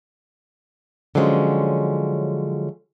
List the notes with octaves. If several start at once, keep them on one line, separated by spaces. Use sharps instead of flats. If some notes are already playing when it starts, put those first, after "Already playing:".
D3 F3 F#3 G#3 C4 C#4